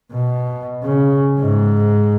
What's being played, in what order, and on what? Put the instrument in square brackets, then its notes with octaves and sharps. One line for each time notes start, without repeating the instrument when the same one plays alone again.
[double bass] B2
C#3
G#2